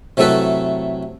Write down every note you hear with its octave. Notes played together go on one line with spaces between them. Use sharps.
C3 F#3 A3 E4 A4 B4